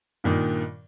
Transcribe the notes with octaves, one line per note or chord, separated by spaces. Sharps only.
G2 A#2 D#3